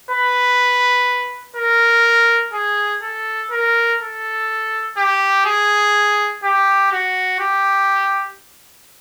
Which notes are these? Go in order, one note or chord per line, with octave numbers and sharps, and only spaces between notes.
B4
A#4
G#4
A4
A#4
A4
G4
G#4
G4
F#4
G4